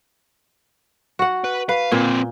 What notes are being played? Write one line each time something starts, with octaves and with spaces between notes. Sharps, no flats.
F#4 F#5
B4
B4 F5
A#2 A#3 C4